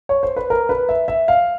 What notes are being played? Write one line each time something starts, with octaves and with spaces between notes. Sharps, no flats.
C#5
C5
B4
A#4
B4
E5
E5
F5